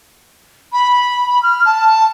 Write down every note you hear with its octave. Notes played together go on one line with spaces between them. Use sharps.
B5
F6
A5